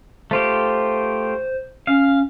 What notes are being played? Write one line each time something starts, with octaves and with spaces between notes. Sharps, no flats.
A3 F4 G4 C5
C#4 F5